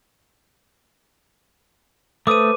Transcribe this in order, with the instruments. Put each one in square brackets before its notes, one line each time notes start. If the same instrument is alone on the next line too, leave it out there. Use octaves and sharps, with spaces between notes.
[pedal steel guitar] A3 D#6 [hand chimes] A4 B4 C5 [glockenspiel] D6 D#7